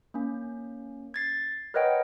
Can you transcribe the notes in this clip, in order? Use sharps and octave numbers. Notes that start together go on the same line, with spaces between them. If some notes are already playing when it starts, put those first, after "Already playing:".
A#3 C#4
G#6 A6 C7
A#4 B4 C#5 D#5 F#5 G5